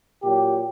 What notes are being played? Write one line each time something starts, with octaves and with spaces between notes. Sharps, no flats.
A#2 F#3 G4